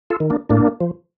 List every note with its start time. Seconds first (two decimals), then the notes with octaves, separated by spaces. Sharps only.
0.10 F4 A4
0.20 D#3
0.30 A#3 D4
0.49 A2 A#3 D4
0.81 F3